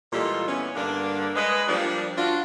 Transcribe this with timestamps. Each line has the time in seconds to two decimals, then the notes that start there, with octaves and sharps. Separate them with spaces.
0.12 A#2 E3 G3 G#3 F4 A4
0.47 E3 B3 C#4
0.75 G2 D3 A#3 D4
1.35 G#3 B4 D#5
1.68 F3 G3 A#3 D4
2.16 D4 F4 F#4